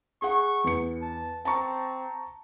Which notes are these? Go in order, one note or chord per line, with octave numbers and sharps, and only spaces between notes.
G#4 F#5 C#6
E2 C#7
A5
C4 A5 A#5 C#6